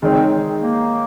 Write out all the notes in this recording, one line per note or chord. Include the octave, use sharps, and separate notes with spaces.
D#3 G#3 C4 D#4 G#4 C#5
A#3